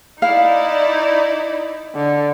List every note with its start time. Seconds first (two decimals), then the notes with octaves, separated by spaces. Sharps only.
0.22 D#4 E4 D5 F5
1.95 D3